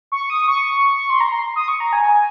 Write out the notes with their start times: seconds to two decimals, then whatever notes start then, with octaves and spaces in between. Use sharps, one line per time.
0.12 C#6
0.30 D#6
0.48 C#6
1.10 C6
1.20 A#5
1.32 C6
1.56 D#6
1.68 C#6
1.80 A#5
1.93 G#5